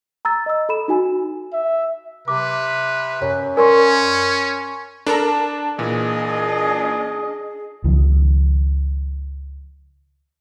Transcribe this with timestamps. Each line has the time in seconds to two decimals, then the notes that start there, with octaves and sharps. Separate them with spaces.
0.25 A#5 E6 A6
0.46 D#5 E6
0.69 A4 B5 E7
0.88 D#4 F#4 G#5
1.53 E5
2.28 C3 B4 D6
3.22 F#2 C#5
3.57 C#4 A#4 D5 G#5 C6 C#6
5.07 D4 A4 A#4 A5 A#5
5.78 A#2 E3 D4 G#4 D#5
7.84 C#2 D#3 F3